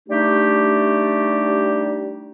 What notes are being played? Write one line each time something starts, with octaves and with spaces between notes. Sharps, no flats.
G3 A3 D4 D#4 G4